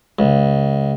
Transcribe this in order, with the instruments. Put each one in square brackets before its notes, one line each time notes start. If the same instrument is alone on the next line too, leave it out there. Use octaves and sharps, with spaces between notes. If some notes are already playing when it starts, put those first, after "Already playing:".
[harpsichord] C#2